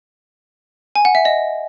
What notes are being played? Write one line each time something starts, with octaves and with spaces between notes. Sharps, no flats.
G#5
F#5
E5
D#5